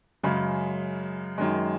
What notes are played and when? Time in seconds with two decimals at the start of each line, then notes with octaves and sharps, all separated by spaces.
0.23 F#2 C#3 G#3
1.38 F#2 D#3 G#3